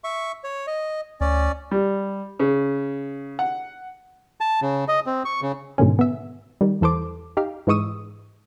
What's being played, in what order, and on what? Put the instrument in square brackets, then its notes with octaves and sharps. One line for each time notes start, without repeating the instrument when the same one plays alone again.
[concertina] E5 C#6
C#5
D#5
[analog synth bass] D2 [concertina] C#4 D5
[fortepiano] G3
C#3
F#5
[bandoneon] A5
C#3
D#5
C4
C#6
C#3
[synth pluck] G#2 B2 D3 D#3 C#4
B3 E5
D#3 G3
E2 E3 A4 C5 D6
D#4 G4 F5
G#2 E3 G#3 C#6 D#6 E6